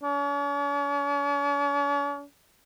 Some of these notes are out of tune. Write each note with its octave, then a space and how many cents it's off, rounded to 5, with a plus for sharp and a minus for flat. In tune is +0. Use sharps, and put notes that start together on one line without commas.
C#4 +45